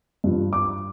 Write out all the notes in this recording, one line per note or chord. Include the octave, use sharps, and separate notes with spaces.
G2 F3
D6